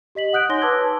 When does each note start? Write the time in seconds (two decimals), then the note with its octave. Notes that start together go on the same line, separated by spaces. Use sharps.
0.15 G4 D#5 B6 F#7
0.33 F#5 D#6 F#6 G6 D7
0.49 D#4 C#5 G#5 C6 A#6 G7
0.62 B4 A5 D6 E6 F#6 G#6
0.81 D6